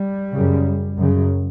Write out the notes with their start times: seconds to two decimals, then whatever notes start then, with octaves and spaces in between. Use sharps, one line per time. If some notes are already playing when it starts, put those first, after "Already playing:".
Already playing: G3
0.33 F#2 C#3
0.97 F#2 C#3